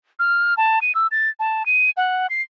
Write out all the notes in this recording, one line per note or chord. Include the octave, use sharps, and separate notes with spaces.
F6
A5
D#7
E6
A6
A5
D#7
F#5
C7